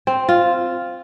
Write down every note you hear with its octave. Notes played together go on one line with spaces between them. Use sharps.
C4
F4